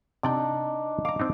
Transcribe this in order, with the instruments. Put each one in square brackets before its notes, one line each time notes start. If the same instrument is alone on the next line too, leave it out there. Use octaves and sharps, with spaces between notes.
[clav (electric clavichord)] C3 D5 G5 [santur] D4 D#4
[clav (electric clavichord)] F5 A#5 [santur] D6
[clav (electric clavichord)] C4 D4 D#4